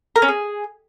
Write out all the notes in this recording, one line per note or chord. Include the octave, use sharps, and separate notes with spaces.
A#4
C#4
G#4